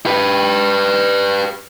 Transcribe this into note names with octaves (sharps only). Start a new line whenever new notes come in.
G4 B4